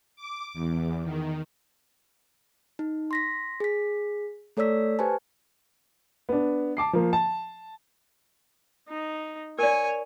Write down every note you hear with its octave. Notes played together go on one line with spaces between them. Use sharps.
D6
E2
D#3
D#4
C6 A#6 B6
G#4 B6
A3 A4 C#5 D5 E6 B6
G4 B4 C5 G#5 A5
B3 D4
A5 D6 C7
F3 A#3
A5
D#4
A#4 C#5 D5 G#5